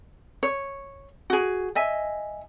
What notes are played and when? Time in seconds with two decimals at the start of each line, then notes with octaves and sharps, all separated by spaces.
0.43 C#5
1.30 F#4 G#4
1.75 D#5 E5 G#5